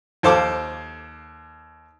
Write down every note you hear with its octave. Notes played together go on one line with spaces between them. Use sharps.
D#2 A4 C5 F5 D6